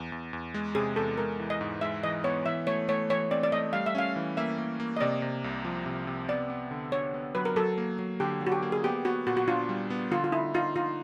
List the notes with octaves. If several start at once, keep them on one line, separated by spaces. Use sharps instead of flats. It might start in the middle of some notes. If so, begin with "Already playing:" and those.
Already playing: E2
E2
E2
G#3
C3 G#4
E2 A4
G#3 A#4
E3
D#5
G#2
G#3 E5
E3 D#5
B3 C#5
E3 E5
A3 C#5
A3 C#5
E3 C#5
C4 D5
D5
A3 D#5
G3 F5
E5
C#4 F5
E3
A#3 E5
A#3
A#3
D#5
C3 D5
C3
C2
F3
C3
C3
B3 D5
B3
D3
D3 C#5
B3
F#3 B4
A#4
F#3 A4
A#3
F#3
D3 G4
F#3
F#4
G4
A#3
G#4
B3 G4
B3 F#4
A#2 F#4
F#4
D4 F4
G3
B3
D3 F4
F4
D#4 E4
D#4 F4
D#4 F4